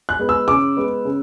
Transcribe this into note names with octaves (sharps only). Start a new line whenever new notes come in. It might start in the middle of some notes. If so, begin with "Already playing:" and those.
F#6
G#3 B3
E6
C#3 D6
G#3 B3
C#3